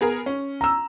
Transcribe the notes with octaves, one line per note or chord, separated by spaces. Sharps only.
B3 G#4 A#4
C#4
A#5 E6